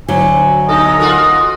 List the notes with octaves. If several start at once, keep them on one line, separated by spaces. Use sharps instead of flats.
D2 D3 F#3 G#5
B2 D#4 A4 D#5
F4 F#4 A#4